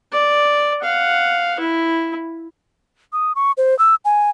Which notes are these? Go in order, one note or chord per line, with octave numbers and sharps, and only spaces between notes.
D5
F5 F#5
E4
D#6
C#6
C5
E6
G#5